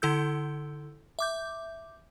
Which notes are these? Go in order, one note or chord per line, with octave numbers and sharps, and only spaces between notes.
D3 E4 A4 E6 G6
E5 D6 G6